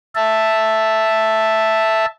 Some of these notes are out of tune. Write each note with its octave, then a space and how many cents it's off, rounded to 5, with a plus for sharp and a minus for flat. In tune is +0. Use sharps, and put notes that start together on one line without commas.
E5 +0 A5 +0